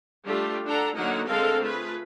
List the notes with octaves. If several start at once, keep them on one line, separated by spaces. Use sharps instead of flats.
G3 A3 D4 F4 G4
D4 A4 F#5 A#5
D3 F#3 A#3 D#4 A#4 F#5
D3 G#3 C4 A4 A#4 F5
A3 F4 G#4 B4